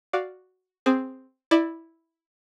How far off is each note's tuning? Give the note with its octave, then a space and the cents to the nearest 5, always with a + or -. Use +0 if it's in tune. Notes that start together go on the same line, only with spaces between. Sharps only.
F#4 +0 D5 +0 F5 +0
C4 +0 G#4 +0
E4 -5 D5 +20